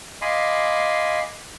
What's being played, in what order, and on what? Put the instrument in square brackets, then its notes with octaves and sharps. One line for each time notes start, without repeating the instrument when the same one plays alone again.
[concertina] D#5 F5 G#5 B5 C6 D6